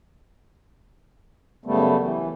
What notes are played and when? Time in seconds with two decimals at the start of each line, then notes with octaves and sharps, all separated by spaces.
1.66 F#2 C#3 G3 A3 B3
2.01 E3